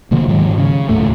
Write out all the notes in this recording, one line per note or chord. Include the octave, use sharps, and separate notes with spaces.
B2 D3 F3 A#3
G#2 D#3 F#3 G#3
C#3
D#2 A2 A3